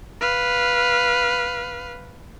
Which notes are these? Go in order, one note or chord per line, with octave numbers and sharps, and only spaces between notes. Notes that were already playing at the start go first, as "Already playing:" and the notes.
B4 F5